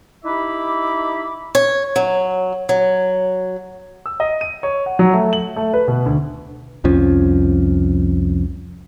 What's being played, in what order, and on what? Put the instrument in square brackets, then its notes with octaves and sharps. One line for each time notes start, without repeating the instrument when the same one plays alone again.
[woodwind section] D#4 E4 G4 E5 B5 D6
[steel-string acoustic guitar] C#5
F#3
F#3
[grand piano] E6
D#5
D#7
C#5
F#5
F#3
A3
F#7
A3
B4
B2
D2
[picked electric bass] C2 F2 F3 C#4